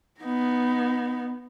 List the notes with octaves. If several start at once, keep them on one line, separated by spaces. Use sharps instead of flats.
B3 D#4